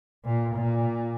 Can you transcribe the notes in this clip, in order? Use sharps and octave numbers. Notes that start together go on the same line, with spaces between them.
A#2
A#2